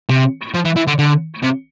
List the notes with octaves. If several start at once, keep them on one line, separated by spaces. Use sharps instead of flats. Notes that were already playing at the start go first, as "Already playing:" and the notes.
C3
F3
E3
E3
D3
D3
C3